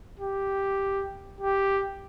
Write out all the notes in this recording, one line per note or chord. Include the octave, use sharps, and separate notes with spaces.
G4
G4